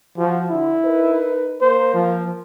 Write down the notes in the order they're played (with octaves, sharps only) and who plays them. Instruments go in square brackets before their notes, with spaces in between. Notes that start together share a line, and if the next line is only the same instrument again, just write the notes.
[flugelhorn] F3 [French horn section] F#4
[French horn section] D3 [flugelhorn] E4
[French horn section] D#4 A#4 B4
[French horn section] A#3 A#4 [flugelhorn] C5
[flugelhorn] F3